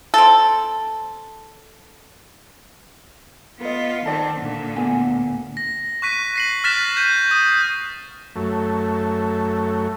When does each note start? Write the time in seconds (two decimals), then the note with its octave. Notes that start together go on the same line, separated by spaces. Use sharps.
0.14 C4 A4
3.61 B3 F4 B4 D#5
4.06 D#3 C4 D5 F#5 A5
4.40 A#2 D3
4.76 D2 B3 G#5
5.57 A#6
6.02 C#6 F#6 B6 D#7
6.36 A#6 C7 F#7
6.64 F6 F#6 A6 B6 E7
6.97 G6 D#7
7.31 D#6
8.36 F#2 A3